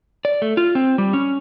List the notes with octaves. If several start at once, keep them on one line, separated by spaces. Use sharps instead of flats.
D5
A3
F4
C4
G3
C#4